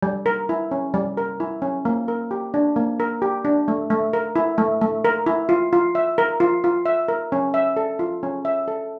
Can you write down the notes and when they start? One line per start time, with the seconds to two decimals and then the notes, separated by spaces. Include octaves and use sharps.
0.03 G3
0.26 A#4
0.49 E4
0.71 C#4
0.94 G3
1.17 A#4
1.40 E4
1.62 C#4
1.85 A#3
2.08 A#4
2.31 G4
2.54 D4
2.76 A#3
3.00 A#4
3.22 G4
3.45 D4
3.68 A3
3.90 A3
4.13 A#4
4.36 E4
4.58 A3
4.81 A3
5.05 A#4
5.26 E4
5.49 F4
5.73 F4
5.95 E5
6.18 A#4
6.40 F4
6.64 F4
6.86 E5
7.08 A#4
7.32 C#4
7.54 E5
7.77 A4
7.99 F4
8.23 C#4
8.45 E5
8.68 A4